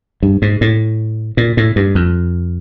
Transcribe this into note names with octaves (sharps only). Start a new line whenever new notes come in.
G2
G#2
A2
A#2
A2
G2
F2